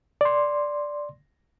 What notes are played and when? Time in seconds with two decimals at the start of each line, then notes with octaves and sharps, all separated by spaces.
0.21 D5 C6